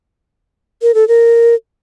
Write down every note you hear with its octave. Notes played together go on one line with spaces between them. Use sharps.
A#4
A4
A#4